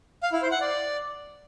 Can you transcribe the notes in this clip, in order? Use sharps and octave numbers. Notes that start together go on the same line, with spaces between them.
F5
E4
C5
F#5
D5